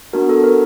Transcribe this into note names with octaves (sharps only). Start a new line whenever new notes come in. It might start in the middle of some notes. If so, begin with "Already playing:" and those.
B3 D4 F#4 A#4
A4
A#4